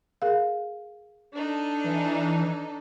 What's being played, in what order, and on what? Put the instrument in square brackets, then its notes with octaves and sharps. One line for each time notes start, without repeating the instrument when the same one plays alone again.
[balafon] G#4 A#4 F5
[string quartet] D4 D#4 A4
[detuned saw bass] E3